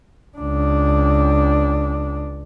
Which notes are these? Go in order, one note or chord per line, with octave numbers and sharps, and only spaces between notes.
C#2 D4